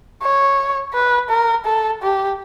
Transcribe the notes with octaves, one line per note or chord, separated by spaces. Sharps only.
C#5
B4
A#4
A4
G4